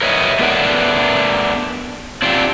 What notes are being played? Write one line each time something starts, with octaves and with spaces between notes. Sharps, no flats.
A#4 B4 C#5 D#5 E5
A3 B3 D4 A#4 B4
C4 D4 F4 G4